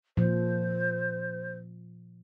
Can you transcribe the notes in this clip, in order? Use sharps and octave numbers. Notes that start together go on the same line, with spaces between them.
A#2 F3 C5